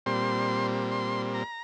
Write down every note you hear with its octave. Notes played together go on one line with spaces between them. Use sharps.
A#2 G3 C4 C6
C6
A#5